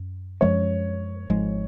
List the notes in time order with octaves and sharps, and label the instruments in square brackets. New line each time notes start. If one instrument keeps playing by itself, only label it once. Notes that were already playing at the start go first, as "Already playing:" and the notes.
Already playing: [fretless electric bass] F#2
[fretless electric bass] F#2 F3 G#3 C#4 [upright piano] C#5
[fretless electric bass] G#1 G#2 F3 G#3